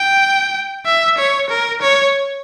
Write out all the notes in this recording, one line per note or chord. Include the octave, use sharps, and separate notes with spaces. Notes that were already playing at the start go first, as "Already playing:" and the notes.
Already playing: G5
E5
C#5
A#4
C#5